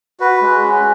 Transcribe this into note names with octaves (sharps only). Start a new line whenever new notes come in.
F#4 B4
G#3
C#4